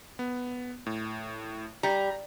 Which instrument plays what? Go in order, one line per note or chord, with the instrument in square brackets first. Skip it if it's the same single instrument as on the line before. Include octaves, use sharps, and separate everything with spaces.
[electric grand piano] B3
A2
[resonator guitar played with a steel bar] G3 [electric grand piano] A#5